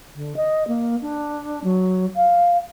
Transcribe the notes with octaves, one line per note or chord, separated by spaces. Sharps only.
D3
D#5
A#3
D4
F#3
F5